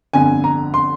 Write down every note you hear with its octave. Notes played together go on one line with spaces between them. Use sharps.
G1 F2 D3 G#5
A#5
C6